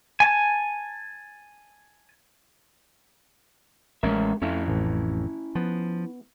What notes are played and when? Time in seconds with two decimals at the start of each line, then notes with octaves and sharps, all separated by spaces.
0.20 G#5 A5
4.03 A1 G#3 C#4 A#4 E5
4.42 F2 A3 C#4 E4 E5 F5
4.68 A1
5.55 F3 B3